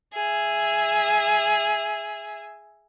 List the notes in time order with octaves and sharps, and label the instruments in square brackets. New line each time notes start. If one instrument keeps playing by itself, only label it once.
[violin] G#4 E5